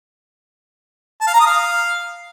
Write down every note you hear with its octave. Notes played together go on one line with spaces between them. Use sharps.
A5
F5
A#5
D#6
F5